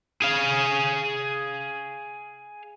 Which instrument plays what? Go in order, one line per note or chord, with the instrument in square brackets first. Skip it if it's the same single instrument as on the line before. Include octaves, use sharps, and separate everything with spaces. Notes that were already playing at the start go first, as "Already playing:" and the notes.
[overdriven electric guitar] G#4 F5